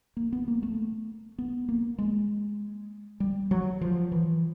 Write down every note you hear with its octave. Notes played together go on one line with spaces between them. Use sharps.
A#3
B3
A#3
A3
B3
A#3
G#3
G3
F#3
F3
E3